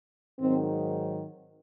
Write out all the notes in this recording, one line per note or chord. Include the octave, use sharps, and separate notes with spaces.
G#2 D#3 F#3 C4